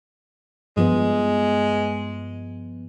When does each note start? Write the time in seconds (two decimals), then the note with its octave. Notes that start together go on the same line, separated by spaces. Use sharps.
0.77 G2 F3 G#3 B3